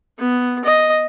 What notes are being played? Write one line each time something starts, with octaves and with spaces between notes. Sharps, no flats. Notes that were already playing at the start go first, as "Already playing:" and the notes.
B3
D#5